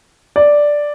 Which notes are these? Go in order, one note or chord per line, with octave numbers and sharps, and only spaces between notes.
D5